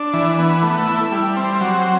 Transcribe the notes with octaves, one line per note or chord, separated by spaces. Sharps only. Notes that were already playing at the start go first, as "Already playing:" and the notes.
Already playing: D4
E3
B3
A3
E4
G3
C4
F#3